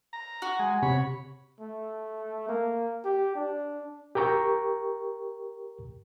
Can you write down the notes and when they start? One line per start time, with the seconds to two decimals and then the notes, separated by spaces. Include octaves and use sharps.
0.13 A#5
0.42 F#4
0.59 G#3
0.82 C3 C#5 B5
1.60 A3
2.49 A#3
3.05 G4
3.35 D4
4.15 G4 A#4 G5 A#5 C#6